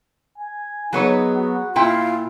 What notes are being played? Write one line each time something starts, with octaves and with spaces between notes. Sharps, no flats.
G#5
F#3 B3 D#4 G#4 C#5
F#4
A#2 E4 F4 G5 C6